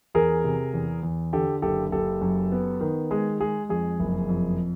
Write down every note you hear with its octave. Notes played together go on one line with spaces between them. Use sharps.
E2 G#4 A#4
C3
E2
E2
D3 G4 A4
F#1 G4 A4
F#1 G4 A4
F#2
B3
D#3
G#3 G#4
G#3 G#4
F2 G#4
F#1
F2